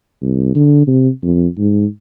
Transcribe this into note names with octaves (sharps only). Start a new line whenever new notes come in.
C2
D3
C3
F2
G#2